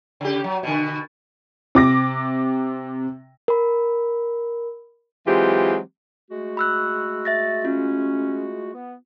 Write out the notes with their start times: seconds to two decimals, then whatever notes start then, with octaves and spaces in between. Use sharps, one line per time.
0.21 C#3 G4
0.44 F#3
0.63 B2 D3
1.75 C3 D6 A#6
3.48 A#4 B5
5.27 E3 F#3 G#3 C4 F4 G4
6.31 G#3 A3 F#4
6.57 B5 E6 F#6
7.25 E5 A6 A#6
7.65 C#4 F4
8.74 B3